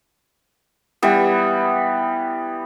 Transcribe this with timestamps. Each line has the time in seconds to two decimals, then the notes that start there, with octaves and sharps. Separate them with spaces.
1.02 E3 G3 B3